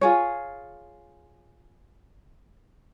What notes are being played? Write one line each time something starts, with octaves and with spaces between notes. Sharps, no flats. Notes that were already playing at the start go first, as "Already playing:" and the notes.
F4 G#4 C#5